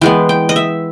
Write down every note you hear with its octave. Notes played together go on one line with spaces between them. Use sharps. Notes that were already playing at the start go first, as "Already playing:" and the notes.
E3 G#3 B3 G5
G5
D#5
E5